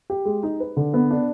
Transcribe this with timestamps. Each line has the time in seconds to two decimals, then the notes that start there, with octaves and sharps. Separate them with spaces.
0.10 G4
0.25 G#3
0.43 D#4
0.60 B4
0.77 D3
0.94 B3
1.11 D4